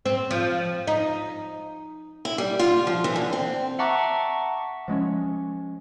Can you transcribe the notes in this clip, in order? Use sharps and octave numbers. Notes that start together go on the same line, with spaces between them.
C4
F3
D#4
E4
G3
F4
F3
E3
D3
C4
E5 F#5 A5 A#5 C#6 D6
F3 G#3 C4 C#4